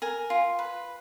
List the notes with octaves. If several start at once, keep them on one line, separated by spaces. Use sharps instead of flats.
A#4 G#5
F4
B4